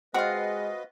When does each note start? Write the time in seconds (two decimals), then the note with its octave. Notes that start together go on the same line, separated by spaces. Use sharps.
0.14 G#3 C4 F4 F#4 B4 D#5 F5